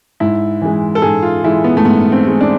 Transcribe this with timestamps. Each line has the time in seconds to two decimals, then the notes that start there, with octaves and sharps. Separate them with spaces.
0.20 G#2 E4
0.62 E3 G#3
0.95 A4
1.02 G#2 G#4
1.23 F4
1.44 E3 G#3 E4
1.64 B3
1.77 A3
1.85 G#2 B3
2.12 C4
2.27 E3 G#3
2.41 D4